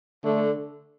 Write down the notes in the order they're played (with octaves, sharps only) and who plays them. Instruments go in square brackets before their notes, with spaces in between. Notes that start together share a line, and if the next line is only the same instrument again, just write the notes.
[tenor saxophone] D3 [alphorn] A3